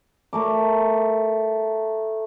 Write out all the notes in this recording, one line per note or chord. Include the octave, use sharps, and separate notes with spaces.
A3 A#4 D6